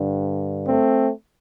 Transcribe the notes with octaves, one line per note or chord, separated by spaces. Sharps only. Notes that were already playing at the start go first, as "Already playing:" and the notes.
Already playing: G2 D3
A3 C4